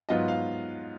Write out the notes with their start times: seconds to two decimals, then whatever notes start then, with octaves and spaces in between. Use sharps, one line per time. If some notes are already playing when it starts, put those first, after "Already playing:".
0.09 G#2 F#3 B3 F4 D#5
0.28 F5